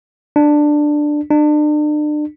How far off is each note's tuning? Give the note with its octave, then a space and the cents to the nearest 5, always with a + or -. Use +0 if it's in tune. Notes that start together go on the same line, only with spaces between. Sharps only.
D4 +10
D4 +35